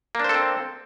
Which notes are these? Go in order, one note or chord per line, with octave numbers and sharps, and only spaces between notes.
A#3 C4 D4 A4 C5